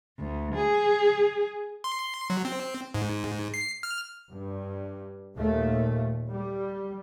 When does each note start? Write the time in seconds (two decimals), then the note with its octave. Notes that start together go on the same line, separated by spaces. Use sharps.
0.18 D2
0.54 G#4
1.84 C6
2.30 F#3
2.45 C4
2.94 G#2
3.54 C7
3.83 F6
4.32 G2
5.37 D#2 A#2 A3
6.30 G3